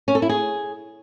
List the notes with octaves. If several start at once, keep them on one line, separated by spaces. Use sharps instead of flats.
C#4
A4
E4
G#4